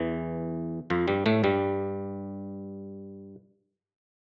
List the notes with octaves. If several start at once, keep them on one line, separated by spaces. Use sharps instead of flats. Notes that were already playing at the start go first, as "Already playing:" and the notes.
Already playing: E2 E3
F2 F3
G2 G3
A2 A3
G2 G3